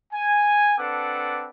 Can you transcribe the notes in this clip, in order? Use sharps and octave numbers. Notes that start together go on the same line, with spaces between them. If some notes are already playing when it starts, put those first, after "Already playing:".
G#5
C4 D4 A4 B4 F#5 D6